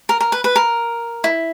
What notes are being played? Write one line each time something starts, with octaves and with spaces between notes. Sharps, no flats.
A#4
A#4
B4
B4
A#4
E4